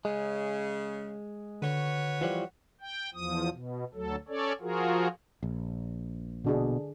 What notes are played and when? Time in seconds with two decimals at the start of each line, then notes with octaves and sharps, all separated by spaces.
0.05 C#3 G#3
1.62 D3 F#4 B4 C#5
2.21 E3 F3 G3
2.81 G5
3.14 E2 F3 D#6
3.52 B2
3.94 D2 F#3 A4
4.28 C#4 A4 C#5 D5
4.61 F3 F4 F#4 G#4 A#4
5.43 A#1
6.45 B2 D3 D4 G#4